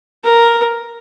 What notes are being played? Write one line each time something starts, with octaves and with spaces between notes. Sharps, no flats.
A#4